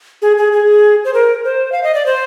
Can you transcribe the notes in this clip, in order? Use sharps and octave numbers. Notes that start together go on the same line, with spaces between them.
G#4
G#4
G#4
C5
A#4
C5
F5
D#5
D5
C5